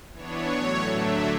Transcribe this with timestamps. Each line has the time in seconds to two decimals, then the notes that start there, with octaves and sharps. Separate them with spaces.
0.13 E3 B3 D4 C#5
0.51 A2 F#3 A3
0.90 D3 F#3 A3 D4 E5